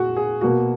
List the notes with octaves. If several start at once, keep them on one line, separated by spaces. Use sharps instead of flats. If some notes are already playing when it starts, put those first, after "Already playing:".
Already playing: A#2 F#4 G#4
G#4
B2 A#3 F#4